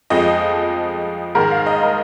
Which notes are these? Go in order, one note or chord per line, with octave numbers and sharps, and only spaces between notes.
F2 F3 G#3 D#5
G#2 D#3 G#3 A#4
F5
D#5
A#4